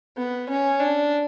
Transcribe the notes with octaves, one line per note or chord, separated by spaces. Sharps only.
B3
C#4
D4